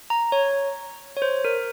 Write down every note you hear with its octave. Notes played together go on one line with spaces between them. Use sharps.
A#5
C#5
C#5
C5
A#4